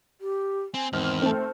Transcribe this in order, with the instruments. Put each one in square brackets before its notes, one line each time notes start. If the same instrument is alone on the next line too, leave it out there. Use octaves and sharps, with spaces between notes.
[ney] G4
[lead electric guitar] C4 [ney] G#5
[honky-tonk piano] G#1 F6 [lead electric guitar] E2 [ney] C4
[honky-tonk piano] A3 C4 [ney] C5